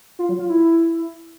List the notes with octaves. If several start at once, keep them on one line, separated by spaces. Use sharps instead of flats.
F4
F#3
F4
E4